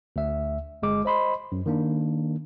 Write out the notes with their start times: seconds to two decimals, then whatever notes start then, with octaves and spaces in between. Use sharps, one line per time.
0.16 D2 E5
0.82 G1 G#3 D6
1.05 C5 D#5 B5 C6
1.52 F#2
1.66 D#3 A#3 D4